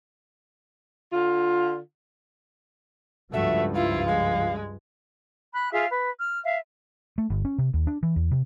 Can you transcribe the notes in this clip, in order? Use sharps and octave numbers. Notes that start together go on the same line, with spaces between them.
D3 F4
C#2 G2 F3 A3 F#4 E5
E4 F4 F5
G#3 F5
B5 F#6
F4 G#4 E5 F5
B4
F6
E5 F5
A3
G1
C#4
C3
D#2
D4
E3
E2
C3